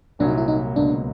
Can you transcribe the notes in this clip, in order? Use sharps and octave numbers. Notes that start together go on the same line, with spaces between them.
C2 A#2 F#3 A#3 D4
D#4
E4
D#4
C#2 B2 F#3 A#3 D4